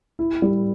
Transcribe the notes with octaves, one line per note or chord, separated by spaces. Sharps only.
E4
G3